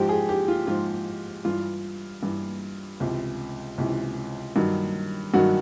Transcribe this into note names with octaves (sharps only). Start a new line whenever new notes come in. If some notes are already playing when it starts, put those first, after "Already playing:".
Already playing: G#2 F3 G4
G#4
G4
F4
G#2 F3 F4
G2 E3 F4
G2 E3
C#2 C3 E3
C#2 C3 E3
G2 D#3 F#3
G2 D#3 F#3 F#4